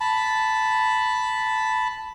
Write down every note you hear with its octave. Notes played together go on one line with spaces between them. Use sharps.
A5 B5